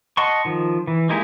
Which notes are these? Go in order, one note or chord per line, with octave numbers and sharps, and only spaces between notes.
D#5 F#5 A5 C6 C#6
D#3 F3
E3
G#3 A#3 D#4 E4 G4